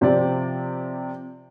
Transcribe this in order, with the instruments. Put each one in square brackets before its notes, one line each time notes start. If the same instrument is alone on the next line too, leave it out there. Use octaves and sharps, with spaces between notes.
[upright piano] C3 F3 C4 G4 D5